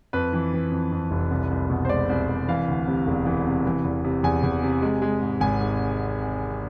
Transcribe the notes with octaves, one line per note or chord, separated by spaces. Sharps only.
F2 B4
E3
E3
F2
F2
F1
C2
C2
B2
C5
G#3 D5
C2
C2
E3 F5
D2
C3
E1
E3
C3
E3
E2
C3
E2 G#5
E2
C3
G#3
G#3
G#2
G#1 G#5
G#2